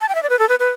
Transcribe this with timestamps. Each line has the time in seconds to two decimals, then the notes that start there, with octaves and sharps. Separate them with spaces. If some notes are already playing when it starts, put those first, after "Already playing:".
0.01 A5
0.09 G5
0.15 E5
0.23 D5
0.30 B4
0.39 A4
0.49 B4
0.59 B4